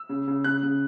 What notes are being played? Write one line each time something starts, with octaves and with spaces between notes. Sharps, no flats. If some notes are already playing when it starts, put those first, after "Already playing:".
Already playing: E6
C#3
C#3
C#3 F#6
C#3